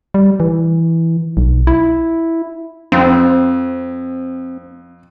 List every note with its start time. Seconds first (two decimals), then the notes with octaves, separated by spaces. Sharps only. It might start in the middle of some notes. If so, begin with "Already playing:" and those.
0.14 G3
0.40 E3
1.37 B1
1.67 E4
2.92 F2 C4